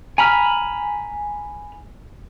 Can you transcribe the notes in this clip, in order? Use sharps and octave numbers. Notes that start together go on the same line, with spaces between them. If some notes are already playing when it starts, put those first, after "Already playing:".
G#5 A#5 B5 F6